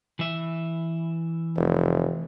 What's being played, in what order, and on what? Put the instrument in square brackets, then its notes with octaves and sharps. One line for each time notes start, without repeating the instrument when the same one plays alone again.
[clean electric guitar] E3 E5
[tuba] F1